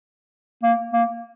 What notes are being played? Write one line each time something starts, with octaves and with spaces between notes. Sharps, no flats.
A#3
A#3